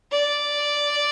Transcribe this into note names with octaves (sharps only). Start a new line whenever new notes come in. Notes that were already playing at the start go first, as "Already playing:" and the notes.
D5